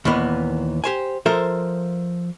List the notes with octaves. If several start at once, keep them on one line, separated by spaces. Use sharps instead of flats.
D#2 A#2 E3 B3
G4 C5 G#5
F3 A4 A#4 C5 E5